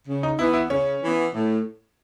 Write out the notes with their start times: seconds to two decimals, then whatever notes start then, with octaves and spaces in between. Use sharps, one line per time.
0.07 C#3
0.23 D#4
0.39 E3 B3 E4
0.54 E4
0.70 C#3 C#4
1.02 E3 B3
1.33 A2